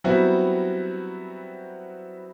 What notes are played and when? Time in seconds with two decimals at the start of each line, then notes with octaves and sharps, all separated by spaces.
0.04 F#3 G3 B3 C4 E4 F#4